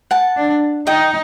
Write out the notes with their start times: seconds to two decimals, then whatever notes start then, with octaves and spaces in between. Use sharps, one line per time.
0.11 F#5 A5
0.37 D4
0.87 D#4 D#5 G5